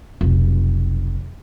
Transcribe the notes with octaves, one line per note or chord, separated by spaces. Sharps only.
F1 B1